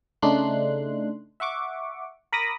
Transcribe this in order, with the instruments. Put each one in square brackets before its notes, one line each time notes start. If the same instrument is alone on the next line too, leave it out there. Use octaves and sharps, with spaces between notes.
[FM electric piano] C#3 A3 D4 D#4 C6 F#6
E5 F#5 C#6 D6
A#4 B5 D6 D#6 A#6